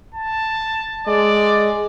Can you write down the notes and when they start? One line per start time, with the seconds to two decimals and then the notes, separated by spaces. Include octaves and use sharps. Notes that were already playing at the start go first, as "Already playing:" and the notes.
0.15 A5
1.07 G#3 D5